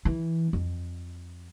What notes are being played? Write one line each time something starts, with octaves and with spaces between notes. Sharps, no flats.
E3
F2